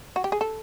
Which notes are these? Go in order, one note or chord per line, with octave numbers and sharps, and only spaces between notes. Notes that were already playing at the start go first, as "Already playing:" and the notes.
F#4
G4
G#4
A4